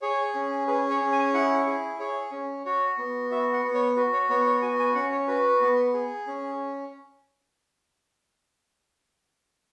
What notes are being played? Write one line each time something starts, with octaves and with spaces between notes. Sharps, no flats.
G#4 C#5
C#4
G#4 B4
C#5
C#4
G#5
E4 F#5
G#4
G#4 C#5
C#4
F#4 C#5
B3
F#4 E5
F#5
B3
C#5
F#4 B4
C#5
B3 C#5
C#5
F#4 G#5
G#5
C#4 F#5
C#5
F#4 B4
B3
G#4
C#4